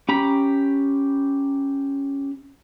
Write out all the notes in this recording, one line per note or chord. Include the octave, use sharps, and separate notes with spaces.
C#4 G4 A#5 B5